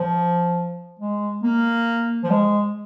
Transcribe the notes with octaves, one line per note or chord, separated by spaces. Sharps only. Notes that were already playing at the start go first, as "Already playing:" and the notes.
Already playing: F3
G#3
A#3
F3
G#3